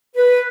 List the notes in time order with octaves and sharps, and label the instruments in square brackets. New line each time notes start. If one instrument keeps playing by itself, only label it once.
[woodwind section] B4